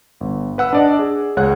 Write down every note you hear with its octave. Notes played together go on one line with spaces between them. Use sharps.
G1
B4 F#5 E6
D4 D5 D#5
G#4
C#2 G#4 C#5 F#5 F#6